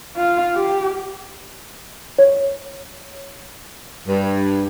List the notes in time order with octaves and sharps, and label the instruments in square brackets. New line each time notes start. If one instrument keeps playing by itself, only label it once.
[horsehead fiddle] F4
G4
[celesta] C#5
[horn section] G2